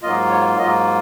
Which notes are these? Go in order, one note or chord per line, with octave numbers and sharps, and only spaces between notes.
G#2 F#3 A#3 F4 D#5
C#5
G#2 F#3 A#3 F4 D#5